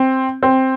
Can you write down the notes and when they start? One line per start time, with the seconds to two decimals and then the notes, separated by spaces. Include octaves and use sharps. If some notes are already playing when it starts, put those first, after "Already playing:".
Already playing: C4
0.43 C4